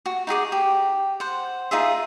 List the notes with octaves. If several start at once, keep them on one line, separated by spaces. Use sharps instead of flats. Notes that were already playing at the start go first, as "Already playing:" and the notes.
F#4
D#4 F#4 G#4 D6
G4
C5 F#5
D#4 F4 G#4 E5